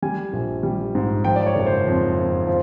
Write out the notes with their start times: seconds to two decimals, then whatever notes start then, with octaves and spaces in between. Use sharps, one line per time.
0.02 G3 G#5
0.33 A#1
0.63 G3
0.95 G#2
1.25 F3 G5
1.36 D5
1.46 C#5
1.55 F#1
1.67 C5
1.87 F2
2.17 F2
2.47 F3